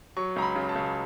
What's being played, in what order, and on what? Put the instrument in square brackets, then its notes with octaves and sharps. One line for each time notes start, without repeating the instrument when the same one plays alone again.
[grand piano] F#3 C#6
C#2 A#5
B5
C#3
A5
C#2